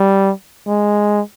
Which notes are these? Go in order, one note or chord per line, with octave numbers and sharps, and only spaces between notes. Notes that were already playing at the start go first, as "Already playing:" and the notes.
Already playing: G3
G#3